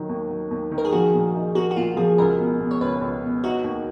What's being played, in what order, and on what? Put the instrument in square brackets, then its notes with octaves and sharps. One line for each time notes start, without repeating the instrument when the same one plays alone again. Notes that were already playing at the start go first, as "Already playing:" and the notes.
Already playing: [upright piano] D#3 F#3
D#2
F#3
D#2
D#3
[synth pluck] A#4
G#4
[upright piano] F3 [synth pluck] F#4
[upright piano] A#2
D#4
[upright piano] A#3 [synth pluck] F#4
[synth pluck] F#4
[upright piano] A#2 [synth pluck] F4
[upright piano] F3 [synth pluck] G#4
[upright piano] C#2 [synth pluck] A#4
[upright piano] B2
B2
[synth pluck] C#5
[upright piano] C#2 [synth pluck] B4
[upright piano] C#2
B2
[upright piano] D#4 [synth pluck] F#4
[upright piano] D#2